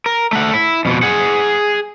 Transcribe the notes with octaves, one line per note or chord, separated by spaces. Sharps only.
A#4
A3 F#5
E4
F2 B2
G#4 F#5